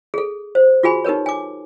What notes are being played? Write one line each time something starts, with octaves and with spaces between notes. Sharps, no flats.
G#4 A4
C5
F4 F#4 G#4 G#5 B5
D#4 G4 A#4 B4 C#5
G#5 D6